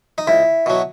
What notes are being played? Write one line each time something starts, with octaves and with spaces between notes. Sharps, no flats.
D#4
C#2 E4
B2 F#3